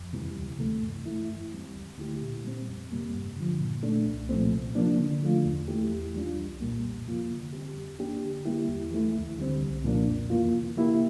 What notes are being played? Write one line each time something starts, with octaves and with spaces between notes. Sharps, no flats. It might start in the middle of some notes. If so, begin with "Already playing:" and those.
Already playing: F2
C3 E3 G3
D2
C3 E3 A3
G2
E3 A3 E4
F2
E3 G3 C4
D2
D3 A3 E4 G4
A#2
G3 C4
F2
C3 G3 A#3
G2
D3 F3
A#2
A3 D4
C2
A#2 F3 A3 C4
C3
F3 A#3 D4
D3
F3 A3 D4 F4
E2
E3 A3 E4 G4
E2
E3 G3 D4 F4
C2
A#2 G3 A#3
F2
C3 F3 A#3 F4
D3
G3 C4 G4
F2
E3 A#3 D4 G4
D3
G3 A#3 E4 G4
E2
E3 A3 E4
D2
D3 G3 C4
C2
A#2 F3 A#3 D4
F2
E3 A#3 F4
C3
E3 A#3 E4 G4